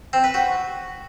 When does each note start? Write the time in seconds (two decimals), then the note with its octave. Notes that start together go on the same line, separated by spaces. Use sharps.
0.13 C4
0.24 B4
0.34 F#4